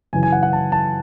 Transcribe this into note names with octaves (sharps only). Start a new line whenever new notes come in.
F#2 C#3 E3 G#5
G#5
F#5
F#5
A5
A5